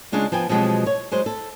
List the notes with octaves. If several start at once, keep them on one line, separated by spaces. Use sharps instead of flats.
C#3 G#3 C#4 D4 F4
F3 B3 G5 G#5
B2 F3 F#3 G#3 C4 G4
C#5
F#3 G#3 C5
A4